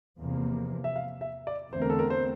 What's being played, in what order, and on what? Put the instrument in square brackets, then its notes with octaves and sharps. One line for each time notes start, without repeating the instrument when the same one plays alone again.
[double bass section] E2 C3 F3 A#3
[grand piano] E5
F5
E5
D5
[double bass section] E2 D3 A3 C4 [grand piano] C5
[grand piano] A#4
A4
A#4
C5